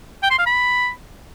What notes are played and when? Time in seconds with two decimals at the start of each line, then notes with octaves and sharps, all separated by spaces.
0.23 G5
0.31 C6
0.39 F5
0.47 B5